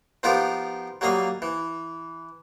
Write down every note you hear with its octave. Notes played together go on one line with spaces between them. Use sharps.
F3 B3 D#4 F4 G4 A#4
F#3 G3 A#3 D#5 F5
E3